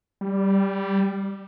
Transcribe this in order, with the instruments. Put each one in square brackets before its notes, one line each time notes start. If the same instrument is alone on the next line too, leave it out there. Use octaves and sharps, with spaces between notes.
[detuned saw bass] G3